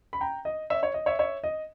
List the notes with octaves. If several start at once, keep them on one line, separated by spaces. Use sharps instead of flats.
B5
G5 A#5
D#5
C#5 E5
C#5
D#5
C#5 E5
C#5 E5
D#5